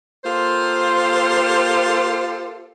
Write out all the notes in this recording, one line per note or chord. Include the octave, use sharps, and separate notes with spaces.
A#3 F4 G4 A4 A#4 C5